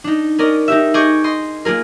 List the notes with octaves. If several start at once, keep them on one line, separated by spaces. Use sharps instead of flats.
D4 D#4
C#4 A#4 D5 D#5
D#4 G4 E5
G#4 D#5 C#6 D6 G6 G#6
D#5 C6
A#3 F4 G#4 A#4